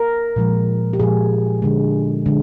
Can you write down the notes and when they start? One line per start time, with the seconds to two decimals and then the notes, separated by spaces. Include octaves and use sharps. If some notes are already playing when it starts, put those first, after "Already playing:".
Already playing: A#4
0.36 A#2 F3 G#3
0.93 G4
1.00 A#2 F3 G#3 G#4
1.62 D3 G#3
2.26 D3 G#3